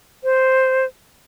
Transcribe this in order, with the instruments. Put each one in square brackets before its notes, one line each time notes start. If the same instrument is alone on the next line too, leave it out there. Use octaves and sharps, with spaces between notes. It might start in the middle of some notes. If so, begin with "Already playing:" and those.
[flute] C5